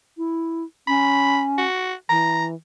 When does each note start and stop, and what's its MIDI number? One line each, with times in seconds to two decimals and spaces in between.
0.18 0.64 64
0.88 1.64 61
0.88 1.41 83
1.58 1.94 66
2.10 2.55 52
2.10 2.45 82